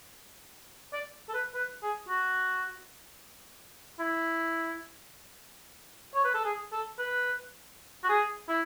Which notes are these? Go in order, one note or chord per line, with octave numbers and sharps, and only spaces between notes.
D5
A4
B4
B4
G#4
F#4
E4
C#5
B4
A4
G#4
A4
B4
F#4
G#4
E4